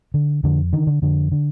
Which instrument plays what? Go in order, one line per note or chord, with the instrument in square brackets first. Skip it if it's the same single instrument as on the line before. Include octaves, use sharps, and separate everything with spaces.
[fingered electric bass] D3
F2 D3
D3 D#3
D3
F2 D3
D3